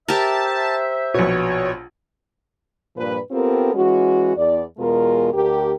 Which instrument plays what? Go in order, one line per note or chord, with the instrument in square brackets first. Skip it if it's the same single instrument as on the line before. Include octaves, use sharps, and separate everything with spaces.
[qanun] G4 A#4 [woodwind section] C5 E5 [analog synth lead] A5
[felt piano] A#1 B2 [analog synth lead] C#5
[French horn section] G2 A#2 F3 B4
B3 C4 F4 G4 A4 A#4
E3 G#3 C#4 F#4
E2 D5
E2 B2 G#3 F4 A#4
D2 G4 A#4